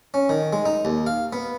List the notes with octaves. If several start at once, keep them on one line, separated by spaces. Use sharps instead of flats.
C#4
D#3
G#3
D#4
D#2
F5
B3